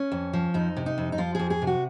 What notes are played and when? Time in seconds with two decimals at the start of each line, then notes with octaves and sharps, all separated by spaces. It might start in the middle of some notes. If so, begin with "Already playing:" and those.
Already playing: C#4
0.12 F2
0.33 F3
0.54 F2 D#4
0.77 C3
0.86 D#4
0.98 F2
1.12 D#4
1.18 F3 F4
1.35 F2 G#4
1.50 G#4
1.62 C3
1.67 F#4